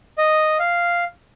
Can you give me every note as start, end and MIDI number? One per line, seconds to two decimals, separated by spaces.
0.18 0.57 75
0.59 1.04 77